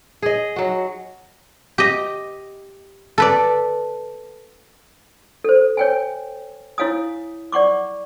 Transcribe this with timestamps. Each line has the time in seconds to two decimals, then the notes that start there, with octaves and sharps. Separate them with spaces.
0.22 G#4 D#5
0.56 F#3 F#4
1.78 G4 D#5
3.18 A4 B4 D5
5.44 A4 C5
5.77 C#5 G5 G#5
6.78 E4 C#5 F5 G#5 D#6
7.52 D5 F#5 C#6 D6